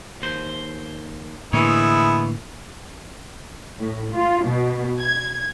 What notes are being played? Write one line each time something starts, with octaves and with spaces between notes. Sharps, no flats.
D#2 C5
A2 D3 E3 G#3 A#3 B3 E4 C#5
A2
F4
B2
G#6